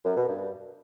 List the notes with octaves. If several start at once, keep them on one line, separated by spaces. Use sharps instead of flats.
F#2
B2
G2